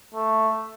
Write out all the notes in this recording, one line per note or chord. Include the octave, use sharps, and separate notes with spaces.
A3